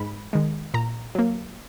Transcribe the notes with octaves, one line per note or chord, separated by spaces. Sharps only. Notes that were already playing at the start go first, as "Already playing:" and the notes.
Already playing: G#2 B5
D#3 G#3
A#2 A#5
F#3 A#3